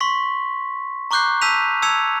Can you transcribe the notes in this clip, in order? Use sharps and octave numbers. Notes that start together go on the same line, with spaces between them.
C6 C#6 B6
A#5 C#6 D6 F#6 G6 C7
A5 E6 G6 B6 D#7 F7
A5 E6 G#6 C#7 F7